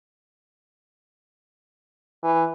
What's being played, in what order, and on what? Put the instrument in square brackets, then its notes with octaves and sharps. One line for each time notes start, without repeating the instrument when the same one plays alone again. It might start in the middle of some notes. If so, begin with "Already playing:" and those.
[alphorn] E3